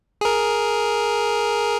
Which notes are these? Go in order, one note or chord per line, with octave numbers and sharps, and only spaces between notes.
G#4 A#4